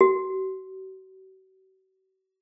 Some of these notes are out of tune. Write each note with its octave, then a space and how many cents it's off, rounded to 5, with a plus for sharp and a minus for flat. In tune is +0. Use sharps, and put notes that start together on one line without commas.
F#4 +40